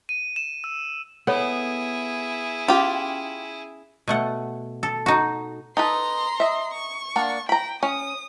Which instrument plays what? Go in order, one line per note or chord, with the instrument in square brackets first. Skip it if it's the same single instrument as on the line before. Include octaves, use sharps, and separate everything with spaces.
[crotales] D#7
E7
E6
[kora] B3 [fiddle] E4 G#4 [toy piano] A4 C#5
[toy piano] C#4 [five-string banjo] F4 G4
[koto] B2 A3 F#5
A4
D#4 F#4
[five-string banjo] D#4 A4 B4 [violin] A#5 C6
[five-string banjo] D#5 E5
[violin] C#6
[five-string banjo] A#3 D4 F#5
[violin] G5 [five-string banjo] A#5 B5
[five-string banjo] C#4 [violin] D#6